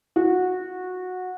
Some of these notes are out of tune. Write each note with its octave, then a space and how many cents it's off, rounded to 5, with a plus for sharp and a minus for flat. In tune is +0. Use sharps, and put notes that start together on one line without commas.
F#4 -15